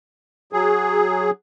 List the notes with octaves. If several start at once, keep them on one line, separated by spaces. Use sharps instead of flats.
F#3 G#4